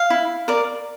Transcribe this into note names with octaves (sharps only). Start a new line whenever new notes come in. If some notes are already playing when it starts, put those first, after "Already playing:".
Already playing: F5
E4
A#4 D5